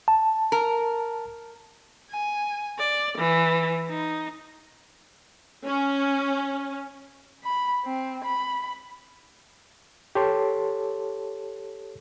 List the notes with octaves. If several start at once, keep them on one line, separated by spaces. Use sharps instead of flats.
A5
A#4
G#5
D5
E3
D#4
C#4
B5
C4
B5
G4 A4 C#5 A5 C6